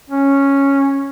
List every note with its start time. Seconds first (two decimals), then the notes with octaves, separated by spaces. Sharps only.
0.10 C#4